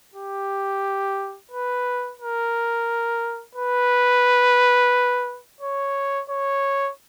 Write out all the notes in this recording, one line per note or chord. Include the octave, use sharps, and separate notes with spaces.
G4
B4
A#4
B4
C#5
C#5